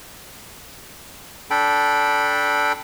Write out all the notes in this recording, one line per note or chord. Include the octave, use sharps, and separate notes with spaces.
D4 A4 G5 B5